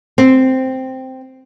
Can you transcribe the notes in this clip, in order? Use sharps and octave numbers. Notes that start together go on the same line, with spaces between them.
C4